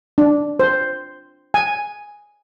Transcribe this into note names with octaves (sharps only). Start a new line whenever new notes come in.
D4
C5
G#5